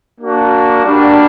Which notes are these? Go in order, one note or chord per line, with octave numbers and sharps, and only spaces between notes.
A#3 D4 F#4
G3 A#3 D4 F#4